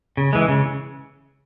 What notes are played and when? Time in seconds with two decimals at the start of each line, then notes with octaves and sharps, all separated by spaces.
0.17 C#3
0.33 E3 G#3
0.48 C#3